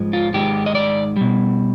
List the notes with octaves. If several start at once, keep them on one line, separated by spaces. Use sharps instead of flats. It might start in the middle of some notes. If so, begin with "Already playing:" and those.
Already playing: G#2 F3 G#3
F4
G#2 D#3 G#3 G4
D#5
D5
B2 G3